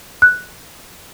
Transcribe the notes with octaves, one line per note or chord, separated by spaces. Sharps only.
F#6